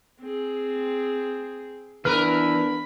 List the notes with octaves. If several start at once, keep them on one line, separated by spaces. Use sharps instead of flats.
C4 G#4
E3 B3 D4 A#4 B4 B5 F6